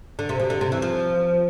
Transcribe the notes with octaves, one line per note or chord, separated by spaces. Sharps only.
D3
C3
B2
D3
C3
E3
F3